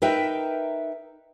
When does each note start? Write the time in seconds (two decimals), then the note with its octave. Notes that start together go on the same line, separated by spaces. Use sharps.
0.02 D#4 A#4 B4 E5 G5